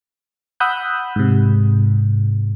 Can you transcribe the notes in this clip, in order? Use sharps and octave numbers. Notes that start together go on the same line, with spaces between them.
F#5 B5 D#6 E6 F#6 G6
G#2 C3